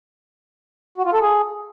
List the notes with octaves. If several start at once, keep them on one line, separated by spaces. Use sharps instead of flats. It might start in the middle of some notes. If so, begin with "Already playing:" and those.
F#4
F4
A4
G#4